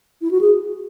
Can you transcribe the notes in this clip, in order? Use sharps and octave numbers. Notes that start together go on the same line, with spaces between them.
E4
F#4
G#4